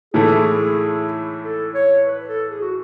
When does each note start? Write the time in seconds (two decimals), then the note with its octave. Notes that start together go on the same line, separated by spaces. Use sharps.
0.13 A2 E3 A3 E4 G#4
1.43 A4
1.75 C#5
2.06 B4
2.28 A4
2.50 G#4
2.61 F#4